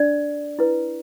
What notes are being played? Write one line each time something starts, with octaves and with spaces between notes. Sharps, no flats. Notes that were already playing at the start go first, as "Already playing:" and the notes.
Already playing: D4 D5
E4 B4